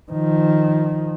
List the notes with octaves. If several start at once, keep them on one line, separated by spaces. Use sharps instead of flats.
D#3 F3